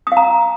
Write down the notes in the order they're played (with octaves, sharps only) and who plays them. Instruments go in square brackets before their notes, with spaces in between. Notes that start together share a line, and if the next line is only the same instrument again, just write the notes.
[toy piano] D#6
F5
A#5